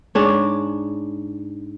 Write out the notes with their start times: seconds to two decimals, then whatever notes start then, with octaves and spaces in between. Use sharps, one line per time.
0.15 G#2 D4 C#5